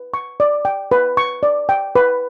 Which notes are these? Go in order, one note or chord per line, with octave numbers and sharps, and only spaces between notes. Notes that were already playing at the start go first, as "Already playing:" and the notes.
Already playing: B4
C#6
D5
G5
B4
C#6
D5
G5
B4